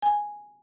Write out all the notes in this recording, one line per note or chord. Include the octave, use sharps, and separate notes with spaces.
G#5